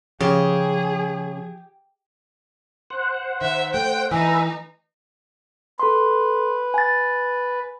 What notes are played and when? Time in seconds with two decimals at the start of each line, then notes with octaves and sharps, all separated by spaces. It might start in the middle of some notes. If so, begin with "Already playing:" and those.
0.21 C#3 F3 G4 G#4
2.90 C5 F#5
3.41 D#3 E5
3.74 A3 G5
4.11 E3 D#4 B4 E5 G#5
5.80 A4 B4 C6
6.74 G#5 A6